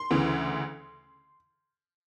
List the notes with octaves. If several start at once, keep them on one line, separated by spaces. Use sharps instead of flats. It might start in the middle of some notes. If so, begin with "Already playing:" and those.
Already playing: C6
D2 C#3 E3